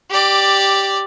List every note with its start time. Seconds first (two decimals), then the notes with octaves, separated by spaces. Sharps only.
0.10 G4 D5